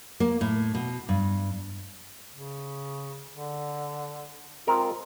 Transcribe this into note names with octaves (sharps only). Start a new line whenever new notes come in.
A#3
A2
B2
G2
C#3
D3
G#3 C4 F4 A#4